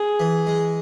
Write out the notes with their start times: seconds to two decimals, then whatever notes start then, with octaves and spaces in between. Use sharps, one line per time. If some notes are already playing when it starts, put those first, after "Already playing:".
Already playing: G#4
0.20 E3
0.47 G#3